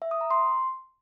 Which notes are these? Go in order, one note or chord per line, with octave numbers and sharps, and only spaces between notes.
E5
D#6
A#5
C6